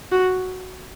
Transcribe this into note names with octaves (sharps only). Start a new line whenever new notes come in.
F#4